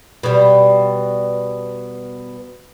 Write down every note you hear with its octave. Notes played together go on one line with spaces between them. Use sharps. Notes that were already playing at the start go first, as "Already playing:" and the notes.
B2 G3